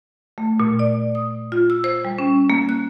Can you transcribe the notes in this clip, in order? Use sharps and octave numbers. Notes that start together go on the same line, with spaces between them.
A3
A#2
D5
D#6
F4
E6
C5
G3
C#4
A#3
F#6